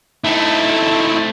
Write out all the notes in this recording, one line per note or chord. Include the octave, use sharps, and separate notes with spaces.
A3 C4 D#4 E4